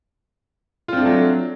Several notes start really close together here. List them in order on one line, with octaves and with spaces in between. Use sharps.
F4 C4 D4 A3 F#3